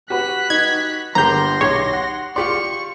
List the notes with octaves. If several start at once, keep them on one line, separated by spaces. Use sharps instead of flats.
F#4 G4 B4 F#6 B6
D#4 G#6
G1 A#3 G4 A#5 C6 G6 A#6
B1 G4 C#5
F#5
F4 G4 D5 C6 C#6 C#7